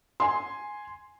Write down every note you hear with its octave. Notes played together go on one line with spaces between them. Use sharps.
G#5 C6